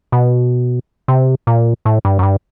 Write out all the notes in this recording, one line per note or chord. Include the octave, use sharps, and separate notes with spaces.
B2
C3
A#2
A2
G2
F#2
G2